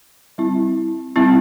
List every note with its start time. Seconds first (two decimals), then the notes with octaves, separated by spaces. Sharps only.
0.38 G3 C4 E4
1.16 G3 C4 E4